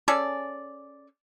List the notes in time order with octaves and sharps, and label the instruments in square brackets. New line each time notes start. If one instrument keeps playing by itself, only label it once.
[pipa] C#4 G#4 A4 D5